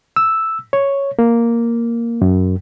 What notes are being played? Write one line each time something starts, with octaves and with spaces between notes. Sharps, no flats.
E6
C#5
A#3
F#2